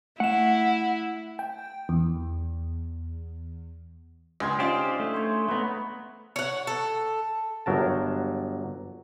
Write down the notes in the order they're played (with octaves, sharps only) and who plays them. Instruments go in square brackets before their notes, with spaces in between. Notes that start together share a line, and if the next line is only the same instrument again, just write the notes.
[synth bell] A3 E7 [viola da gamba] E4 [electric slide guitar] F#5
[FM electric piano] G5
E2
[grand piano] C#2 C6 G#6 [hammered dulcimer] D4 G#4
[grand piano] C#4 D#4 F4 [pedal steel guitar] G4 C5 D5
[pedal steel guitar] A3
[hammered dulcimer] C5 C#5
[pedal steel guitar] A3 B3 [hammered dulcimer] B4 D#5 A#5
[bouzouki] C#5 F#5
A4
[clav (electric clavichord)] G1 F#3 A#4 A5